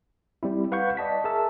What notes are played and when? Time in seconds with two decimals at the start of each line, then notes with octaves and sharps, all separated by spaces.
0.43 G3 C4 E4
0.72 B4 F5 F#5 C#6 G6
0.97 D5 D#5 A5 B6
1.24 G#4 A#4 E5 A5 E6